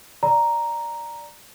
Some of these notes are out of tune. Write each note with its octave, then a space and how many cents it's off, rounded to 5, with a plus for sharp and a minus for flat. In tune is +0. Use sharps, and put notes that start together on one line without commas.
D5 +0 A#5 +0